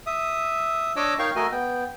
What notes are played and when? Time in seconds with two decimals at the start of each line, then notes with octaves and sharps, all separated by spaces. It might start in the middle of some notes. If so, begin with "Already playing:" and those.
0.06 E5 D#6
0.96 D4 C#5 D#5 D6 E6
1.19 D#4 A#4 C#5 F5 G5 C#6
1.36 A3 F#4 A#4 D#5 G#5
1.52 B3 G5